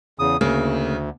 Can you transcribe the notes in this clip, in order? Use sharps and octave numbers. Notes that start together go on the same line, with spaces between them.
E2 C#3 D#6
D2 C#3 A#3